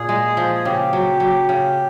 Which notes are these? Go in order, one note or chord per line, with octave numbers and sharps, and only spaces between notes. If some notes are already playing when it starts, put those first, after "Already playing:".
Already playing: A#2 G#4
G#3
F3
G#4
C#3 G4
F#3
F#3
C#3